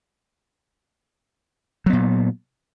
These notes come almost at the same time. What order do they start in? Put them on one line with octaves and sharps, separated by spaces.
F#3 B3 A#2